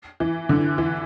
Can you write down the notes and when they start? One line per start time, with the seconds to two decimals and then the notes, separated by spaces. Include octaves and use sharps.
0.20 E3
0.49 D3
0.78 E3